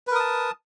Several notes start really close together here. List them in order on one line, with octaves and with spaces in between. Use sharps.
B4 A#4 D#6 A5